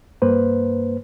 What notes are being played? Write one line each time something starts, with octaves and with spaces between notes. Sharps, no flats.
G2 A#3 B4 C5